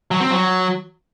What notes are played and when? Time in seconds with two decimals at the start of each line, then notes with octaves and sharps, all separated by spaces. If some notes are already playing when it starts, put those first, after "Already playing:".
0.11 F#3
0.21 C4
0.30 F#3